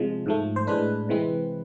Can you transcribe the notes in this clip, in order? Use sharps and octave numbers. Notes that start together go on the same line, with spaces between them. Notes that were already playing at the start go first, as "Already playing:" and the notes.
Already playing: C3 F3 G#3
G#2 F3 A3
C5
A2 G#3 D4 B4
C3 E3 G#3 C4